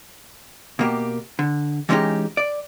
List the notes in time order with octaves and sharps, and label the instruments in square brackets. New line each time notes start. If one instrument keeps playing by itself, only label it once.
[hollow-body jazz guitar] B2 A#3 G4
D3
E3 G3 G#3 C#4 D#4 G4
D5